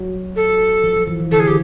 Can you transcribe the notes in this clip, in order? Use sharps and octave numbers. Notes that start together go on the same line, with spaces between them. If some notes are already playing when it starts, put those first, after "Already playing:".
Already playing: F#3
A4
F3
F3
E3
E3
D3 A4
G#4
D#3 G4